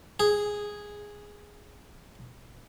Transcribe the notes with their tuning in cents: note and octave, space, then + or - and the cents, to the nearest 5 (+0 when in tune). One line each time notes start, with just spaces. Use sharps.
G#4 -5